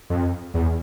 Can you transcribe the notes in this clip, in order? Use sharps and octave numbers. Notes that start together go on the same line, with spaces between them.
F2
E2